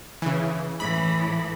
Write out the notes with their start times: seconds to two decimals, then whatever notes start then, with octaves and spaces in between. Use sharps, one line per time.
0.22 C#3 E3
0.80 A2 E3 B5